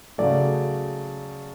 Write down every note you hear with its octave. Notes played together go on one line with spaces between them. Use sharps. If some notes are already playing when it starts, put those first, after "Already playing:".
C#3 F#3 A3 D5